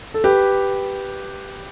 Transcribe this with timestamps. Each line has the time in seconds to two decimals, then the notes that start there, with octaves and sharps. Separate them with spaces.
0.14 A4
0.24 G4 B4